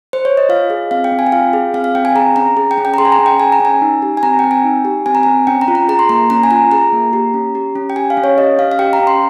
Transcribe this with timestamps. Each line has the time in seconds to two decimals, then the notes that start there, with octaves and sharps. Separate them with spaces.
0.13 C5
0.25 C#5
0.37 D#5
0.49 F4 F5
0.70 G#4
0.91 C4 F5
1.04 G5
1.12 C4
1.19 G#5
1.27 G5
1.32 F4 F5
1.53 G#4
1.74 C4 F5
1.84 F5
1.95 C4 G5
2.05 G#5
2.15 G#4 A#5
2.36 C#4 A#5
2.57 G#4
2.71 G5
2.78 C#4
2.85 G5
2.94 A#5
2.98 G#4 C6
3.05 G#5
3.12 A#5
3.19 C#4
3.26 G5
3.40 G#4 G#5
3.52 A#5
3.60 C#4 G#5
3.82 D#4
4.02 G4
4.17 G#5
4.23 C4 A#5
4.39 C4 G5
4.51 G#5
4.64 D#4
4.85 G4
5.06 C4 G#5
5.15 A#5
5.23 C4 G#5
5.47 C#4 G5
5.61 A#5
5.68 F4
5.75 A#5
5.89 G#4 A#5
5.99 C6
6.09 A#3 A#5
6.30 C#4 A#5
6.43 G#5
6.51 F4 A#5
6.71 G#4 A#5
6.93 A#3
7.13 G4
7.34 C#4
7.55 G4
7.75 C#4
7.90 G5
7.96 G4 G#5
8.10 F5
8.17 C#4
8.24 C#5
8.38 G4 D#5
8.59 C#4 F5
8.71 F5
8.79 G4 G5
8.93 A#5
9.00 C#4
9.07 C6